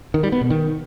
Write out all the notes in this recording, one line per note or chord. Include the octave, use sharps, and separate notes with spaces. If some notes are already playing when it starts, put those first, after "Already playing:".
D#3
G3
B3
B2
D#3